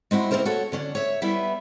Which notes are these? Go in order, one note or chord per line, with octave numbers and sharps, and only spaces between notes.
G#3 C4 E4 F#4
A#3 C4 D4 E4 A#4 C5
F#4 A4 C#5
D3 C#4 D4
C#5 E5
G3 B3 E4 E5